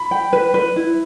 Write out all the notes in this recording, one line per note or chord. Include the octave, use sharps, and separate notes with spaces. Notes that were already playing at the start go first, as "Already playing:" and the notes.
Already playing: B5
G5
B4
B4
E4